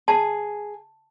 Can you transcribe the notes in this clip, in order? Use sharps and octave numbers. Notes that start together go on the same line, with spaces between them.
G#4 A5